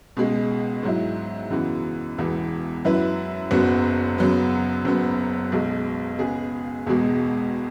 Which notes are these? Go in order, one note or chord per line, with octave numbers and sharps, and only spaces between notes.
C#2 B2 G#3
G#2 F#3 E4
F#2 C#3 E3 B3 F#4
E1 E2 E3 B3
F#2 F#3 E4 B4
F#1 F#2 F#3 B3 F#4
F#2 C#3 F#3 B3
F#1 F#2 F#3 B3
B1 B2 G#3
C#2 C#3 G#3 B3 G#4
E1 E2 B2 G#3